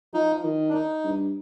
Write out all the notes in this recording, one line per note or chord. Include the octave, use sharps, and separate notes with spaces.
F3 D#4
D#3
D4
D#4
G2